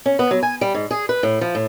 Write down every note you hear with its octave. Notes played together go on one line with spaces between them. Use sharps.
C#4
B3
F#3
G#5
G3
G#2
G#4
B4
A2
F3
A2